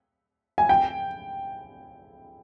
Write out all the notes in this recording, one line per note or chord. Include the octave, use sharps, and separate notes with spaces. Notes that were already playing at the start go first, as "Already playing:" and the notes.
G#5
G5